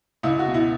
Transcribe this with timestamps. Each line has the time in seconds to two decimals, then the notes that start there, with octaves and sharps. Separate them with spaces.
0.23 C#2 E4
0.39 F#4
0.46 B2
0.54 E4